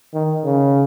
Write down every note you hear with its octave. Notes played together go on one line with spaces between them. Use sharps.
D#3
C#3